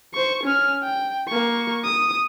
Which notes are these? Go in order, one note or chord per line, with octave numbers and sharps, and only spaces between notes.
C5 C#6
C#4 F6
G5
A#3 C#6
D#6